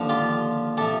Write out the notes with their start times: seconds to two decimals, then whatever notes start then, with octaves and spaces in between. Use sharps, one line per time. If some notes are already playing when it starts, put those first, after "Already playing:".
Already playing: D#2 D3 F3
0.09 F4 G4
0.77 C3 F3 G4 A4